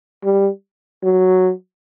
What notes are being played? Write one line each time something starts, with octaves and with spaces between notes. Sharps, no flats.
G3
F#3